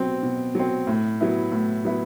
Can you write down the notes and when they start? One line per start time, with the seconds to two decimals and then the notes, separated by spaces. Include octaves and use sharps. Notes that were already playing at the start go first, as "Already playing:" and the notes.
Already playing: B2 F#3 C4
0.23 B2
0.55 F#3 C4
0.87 A2
1.20 F#3 B3 E4
1.52 A2
1.85 F#3 B3 E4